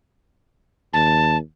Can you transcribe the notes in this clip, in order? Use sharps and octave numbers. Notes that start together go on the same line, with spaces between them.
D#2 A5